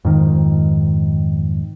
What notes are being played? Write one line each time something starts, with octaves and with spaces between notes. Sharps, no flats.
F2 G#2 D#3